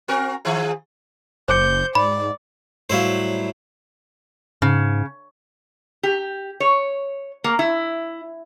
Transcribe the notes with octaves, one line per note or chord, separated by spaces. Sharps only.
C4 F#4 A#4
D#3 F3 G#4
F#1 C5 D6 G6 C#7
G#2 D5 B5
A2 F#3 G3 E4 C5 F5
G#2 C#3
G4
C#5
A#3
E4